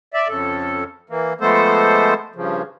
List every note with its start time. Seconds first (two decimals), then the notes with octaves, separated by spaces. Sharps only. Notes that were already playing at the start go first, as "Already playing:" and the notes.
0.14 D5 E5
0.28 F2 C#3 A4
1.10 E3 A#3
1.41 F3 G#3 A3 B3 A4 C5
2.36 G2 C#3 F3